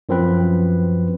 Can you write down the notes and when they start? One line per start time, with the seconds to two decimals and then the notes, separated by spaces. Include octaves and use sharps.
0.09 F#2 F3 C4 B4